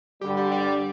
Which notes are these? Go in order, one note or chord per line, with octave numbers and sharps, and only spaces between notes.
G2 D3 G3 G4
G4
D5